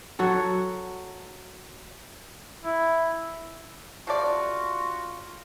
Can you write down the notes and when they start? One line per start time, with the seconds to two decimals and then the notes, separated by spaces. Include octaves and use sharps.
0.19 F#3 F#4 A4
2.64 E4
4.07 C3 F4 F#4 A4 D5